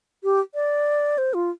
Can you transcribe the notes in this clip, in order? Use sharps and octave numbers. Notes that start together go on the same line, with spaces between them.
G4
D5
C5
F4